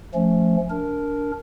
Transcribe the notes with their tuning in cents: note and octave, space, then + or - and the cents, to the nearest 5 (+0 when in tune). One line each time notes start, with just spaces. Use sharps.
F3 +0 A3 +0 C#4 +0
D4 -20 A#4 +0